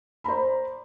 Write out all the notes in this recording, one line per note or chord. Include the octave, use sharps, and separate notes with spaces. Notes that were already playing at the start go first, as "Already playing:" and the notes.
C5 D5 A#5 B5